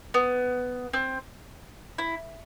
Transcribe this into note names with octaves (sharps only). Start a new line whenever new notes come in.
B3
C4
E4